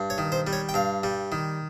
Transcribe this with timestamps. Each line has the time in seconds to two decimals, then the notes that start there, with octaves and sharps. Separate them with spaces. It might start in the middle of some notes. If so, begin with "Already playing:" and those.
Already playing: G2
0.10 C#5
0.18 D#3
0.32 C5
0.47 G3
0.53 C#5
0.69 G5
0.74 G2 F5
1.03 G3
1.32 D#3